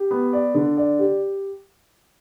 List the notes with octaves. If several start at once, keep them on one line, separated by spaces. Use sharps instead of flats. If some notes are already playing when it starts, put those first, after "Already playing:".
Already playing: G4
B3
D5
D3
D5
G4